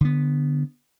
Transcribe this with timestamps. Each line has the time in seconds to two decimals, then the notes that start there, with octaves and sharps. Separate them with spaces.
0.01 D3 B3